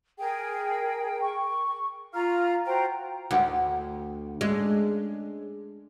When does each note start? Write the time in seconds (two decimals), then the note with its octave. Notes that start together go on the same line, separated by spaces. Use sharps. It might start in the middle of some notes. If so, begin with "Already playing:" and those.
0.19 G#4 A#4 G5
1.22 C#6
2.13 F4 F5 A#5 F6
2.65 F#4 C5 G5 A#5
3.31 D2 F#5 G5
4.41 G#3 C#4 D4 E5